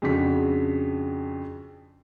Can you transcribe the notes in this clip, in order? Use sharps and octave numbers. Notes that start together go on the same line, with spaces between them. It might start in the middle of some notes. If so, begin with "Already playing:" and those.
F2 C#3 D4 F#4 B6